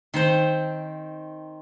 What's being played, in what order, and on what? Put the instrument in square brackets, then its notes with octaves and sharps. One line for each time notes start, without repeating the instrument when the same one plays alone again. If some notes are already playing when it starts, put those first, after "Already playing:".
[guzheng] D#3 C4 C5